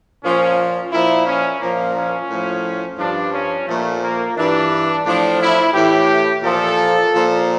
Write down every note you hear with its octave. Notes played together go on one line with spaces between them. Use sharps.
A#2 F3 C#4
A#2 F3 E4
C#4
A#2 F3 A#3
C#4
A2 F3
G2 F3 D4
C#4
A#2 F3 A3
A#3
G2 E3 D4
A2 F3 D4
E4
A2 E3 G4
A#2 F3 A4
A#2 F3